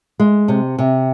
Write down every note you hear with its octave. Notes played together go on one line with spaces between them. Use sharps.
G#3
C3
C3